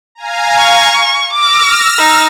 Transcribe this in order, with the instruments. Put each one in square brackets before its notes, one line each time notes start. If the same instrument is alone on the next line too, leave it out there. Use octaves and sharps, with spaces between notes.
[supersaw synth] F5 G#5 A#5
[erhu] C#6
[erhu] D6 [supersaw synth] E6 F6 A#6
[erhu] D#4